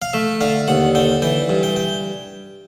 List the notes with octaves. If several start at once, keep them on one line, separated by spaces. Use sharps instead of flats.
F5
A3 E5
D3 F5
D#2 F#5
D3 G5
E3 G5
G2
G5
G5